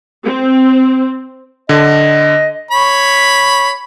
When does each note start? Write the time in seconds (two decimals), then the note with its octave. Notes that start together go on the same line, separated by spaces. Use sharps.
0.24 C4
1.69 D3 D#5
2.71 C#5 B5